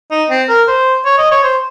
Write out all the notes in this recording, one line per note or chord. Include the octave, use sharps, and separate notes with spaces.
D#4
C4
A#4
C5
C#5
D#5
C#5
C5